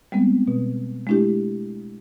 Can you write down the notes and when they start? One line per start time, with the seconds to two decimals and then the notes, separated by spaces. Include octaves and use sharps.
0.12 G3 G#3 B3 C4
0.48 B2
1.07 G#3 A3 D4 E4 G4